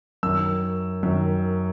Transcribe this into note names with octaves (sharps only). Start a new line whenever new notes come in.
F#2 D#3 E6
F#2 D#3